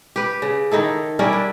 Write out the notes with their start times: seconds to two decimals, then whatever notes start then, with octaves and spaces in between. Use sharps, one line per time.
0.16 G4 B4
0.42 C#3
0.72 D#3 D#4 E4 A4
1.19 G3 C#4 E4 A#4
1.33 D4